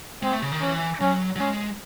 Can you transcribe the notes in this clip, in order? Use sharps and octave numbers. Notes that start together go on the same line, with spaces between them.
G#3 C4
A3
C#3
D#3
E3 C#4
F#3 C#4
F#3
G#3 C#4